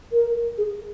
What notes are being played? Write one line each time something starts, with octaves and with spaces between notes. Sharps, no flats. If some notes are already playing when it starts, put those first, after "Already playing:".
A#4
G#4